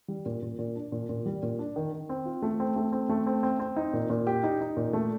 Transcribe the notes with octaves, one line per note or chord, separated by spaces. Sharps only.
G3
A#2
A#2
A#2
D4
A#2
A#2
G3
A#2
D4
D#3
D#3
C4
F4
A3
C4
A3
C4
A3
C4
C4
C4
D#4
A#2
A#2
G4
D#4
D#4
A#2
A3